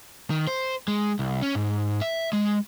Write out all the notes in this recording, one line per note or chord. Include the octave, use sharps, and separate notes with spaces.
D#3
C5
G#3
C2
C#4
G#2
E5
G#3